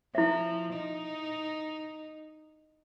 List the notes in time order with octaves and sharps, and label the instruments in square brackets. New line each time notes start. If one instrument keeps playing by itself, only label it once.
[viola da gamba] F3 [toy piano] E4 E5
[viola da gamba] D#4